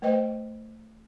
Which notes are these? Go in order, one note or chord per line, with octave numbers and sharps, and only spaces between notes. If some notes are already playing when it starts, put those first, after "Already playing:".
A3 B4 C5 D#5 G5